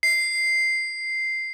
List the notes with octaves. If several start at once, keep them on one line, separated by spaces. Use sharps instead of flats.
C7